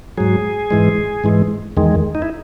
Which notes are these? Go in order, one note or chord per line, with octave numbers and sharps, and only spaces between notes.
G#2 F#3 G#4
G#2 E3 G#3
G#2 E3 G#3
E2 D#3 G#3
D#4
E4